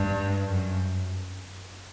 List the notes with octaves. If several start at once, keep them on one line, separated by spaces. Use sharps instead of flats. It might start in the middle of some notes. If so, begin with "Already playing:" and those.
Already playing: G2
F#2